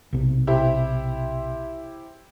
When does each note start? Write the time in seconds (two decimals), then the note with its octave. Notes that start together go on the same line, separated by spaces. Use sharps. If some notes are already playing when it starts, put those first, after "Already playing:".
0.13 B1 C3
0.47 E4 G4 C5